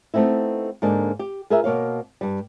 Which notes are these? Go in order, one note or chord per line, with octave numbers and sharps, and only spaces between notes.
A3 B3 C4 D#4 E4
G#2 D3 A#3 D4 D#4
G4
F4 G#4 A#4 B4 E5
B2 A#3 C#5 F5
G2 G3